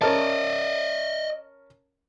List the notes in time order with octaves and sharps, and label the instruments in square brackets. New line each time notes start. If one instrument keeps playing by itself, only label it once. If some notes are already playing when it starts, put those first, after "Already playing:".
[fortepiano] C#4 A#4 A5 [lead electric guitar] D5 D#5